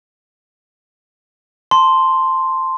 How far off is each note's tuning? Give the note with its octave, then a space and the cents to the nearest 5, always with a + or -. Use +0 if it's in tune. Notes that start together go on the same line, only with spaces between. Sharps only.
A5 +5 C6 +0